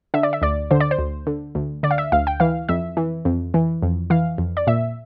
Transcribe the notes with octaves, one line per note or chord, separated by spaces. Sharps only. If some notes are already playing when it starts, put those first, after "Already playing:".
D3 E5
D5
E5
D2 D5
D3 C5
D5
C5
D2
D3
D2
D3 D5
F5
E5
D2 F5
G5
E3 F5
F2 E5
E3
F2
E3
F2
E3 F5
F2
D5
A#2 E5